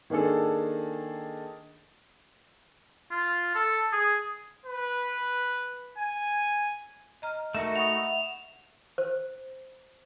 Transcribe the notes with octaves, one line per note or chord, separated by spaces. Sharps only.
D#3 A#3 D4 G#4 A4
F4
A4
G#4
B4
G#5
D#5 A#5 F6
A3 D#4 F#4 A#4 E5 E7
E5 F#5 B5 C#6 D#6 F7
C5